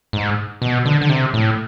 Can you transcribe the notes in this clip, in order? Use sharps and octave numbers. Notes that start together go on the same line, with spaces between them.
G#2
B2
D3
D3
C3
A2